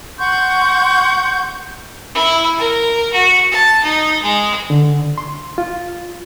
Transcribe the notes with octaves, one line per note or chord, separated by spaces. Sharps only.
F#5 C6 C#6 G6
E4
A#4
F#4
A5
D#4
G#3
D3
C6
F4